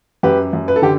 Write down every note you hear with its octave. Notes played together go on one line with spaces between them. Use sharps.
F#2 G4 B4
F#2
B4
A4
D3 G4